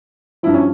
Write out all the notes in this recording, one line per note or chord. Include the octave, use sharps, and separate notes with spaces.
G2 F3 E4
C#4